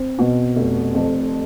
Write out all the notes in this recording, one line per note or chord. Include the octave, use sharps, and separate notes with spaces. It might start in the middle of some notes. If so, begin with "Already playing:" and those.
Already playing: C4
B2
F1
F2